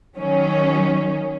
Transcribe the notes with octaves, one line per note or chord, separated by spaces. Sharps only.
D#3 F#3 C#4